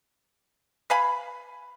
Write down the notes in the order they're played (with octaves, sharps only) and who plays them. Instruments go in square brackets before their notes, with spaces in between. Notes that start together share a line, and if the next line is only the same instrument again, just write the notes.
[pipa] B4 F5 G#5 B5